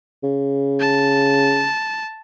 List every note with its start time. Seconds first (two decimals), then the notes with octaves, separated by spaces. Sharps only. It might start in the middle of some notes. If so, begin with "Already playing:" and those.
0.23 C#3
0.80 A5